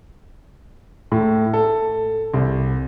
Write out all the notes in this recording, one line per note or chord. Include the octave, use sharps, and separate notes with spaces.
A2
A4
C2